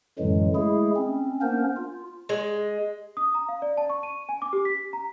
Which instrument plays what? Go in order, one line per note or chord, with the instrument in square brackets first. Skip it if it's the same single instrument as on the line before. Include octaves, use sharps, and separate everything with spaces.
[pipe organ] F#2 A2 D3 E3 F#3 G#3
G#3 A3 E4 G#4
C4 C#4
A#3 B3 C#4 D4 A#4 C5
F4
[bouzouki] G#3
[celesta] D#6
A#5
F5
D5
A5
C#6
D#7
G#5
D6
G4
B6
A#5